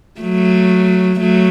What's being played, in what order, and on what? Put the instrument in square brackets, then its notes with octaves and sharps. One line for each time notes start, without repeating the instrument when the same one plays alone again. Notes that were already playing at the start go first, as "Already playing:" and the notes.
[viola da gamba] F#3 A3
F#3 A3